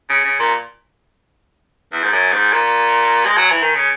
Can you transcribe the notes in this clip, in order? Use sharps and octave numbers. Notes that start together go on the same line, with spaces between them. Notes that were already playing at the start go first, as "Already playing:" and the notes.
C#3
C#3
A#2
E2
G#2
F#2
G#2
A#2
G#3
F#3
E3
D#3
C#3